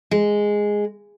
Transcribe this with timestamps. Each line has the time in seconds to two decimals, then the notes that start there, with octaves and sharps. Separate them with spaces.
0.11 G#3